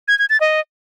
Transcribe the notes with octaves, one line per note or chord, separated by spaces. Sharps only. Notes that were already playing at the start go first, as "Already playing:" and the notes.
G#6
G#6
A6
D#5